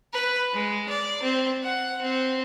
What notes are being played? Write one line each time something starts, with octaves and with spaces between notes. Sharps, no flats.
B4
G#3
D5
C4
F#5
C4